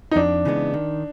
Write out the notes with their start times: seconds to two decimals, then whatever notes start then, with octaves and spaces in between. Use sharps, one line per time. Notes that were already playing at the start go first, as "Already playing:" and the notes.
0.11 D#4
0.16 F2 D4
0.45 C#3 E3 G#3 B3
0.74 D#3